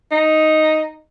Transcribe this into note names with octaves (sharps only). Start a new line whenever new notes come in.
D#4